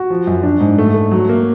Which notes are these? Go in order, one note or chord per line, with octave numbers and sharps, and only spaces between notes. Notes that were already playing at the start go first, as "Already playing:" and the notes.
Already playing: F#4
F3
F#2
D4
G#2
A3
A3
F#3
A#3